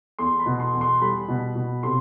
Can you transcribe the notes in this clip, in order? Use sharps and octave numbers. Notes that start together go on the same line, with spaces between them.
E2 C6
B5
B2
C6
E2
C6
G3 B5
B2
B2
C3 C6